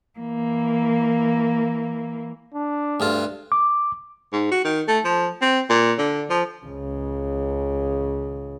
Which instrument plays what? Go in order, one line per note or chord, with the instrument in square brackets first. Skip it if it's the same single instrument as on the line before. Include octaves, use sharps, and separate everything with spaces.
[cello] E3 A#3
[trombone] D4
[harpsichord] D2 G2 F4
[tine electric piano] D6
[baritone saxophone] G#2
F#4
D#3
A3
F3
C4
A#2
D3
F3
[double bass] C#2 C#3